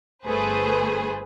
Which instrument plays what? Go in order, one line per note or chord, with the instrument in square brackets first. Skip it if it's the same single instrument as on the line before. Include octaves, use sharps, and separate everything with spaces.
[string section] G1 A3 G#4 B4 C5